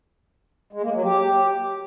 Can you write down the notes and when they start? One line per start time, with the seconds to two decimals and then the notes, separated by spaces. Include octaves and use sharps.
0.73 G#3
0.83 A#3
0.93 F#3
1.04 G4